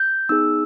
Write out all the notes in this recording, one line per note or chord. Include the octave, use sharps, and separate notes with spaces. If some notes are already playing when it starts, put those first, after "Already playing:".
Already playing: G6
B3 D#4 G#4 E6